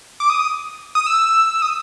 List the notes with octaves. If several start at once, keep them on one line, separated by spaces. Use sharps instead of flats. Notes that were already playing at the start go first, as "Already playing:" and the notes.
D6
D#6
D#6
E6
D#6